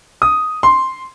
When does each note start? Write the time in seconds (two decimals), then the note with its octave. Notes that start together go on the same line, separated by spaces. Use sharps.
0.22 D#6
0.63 C6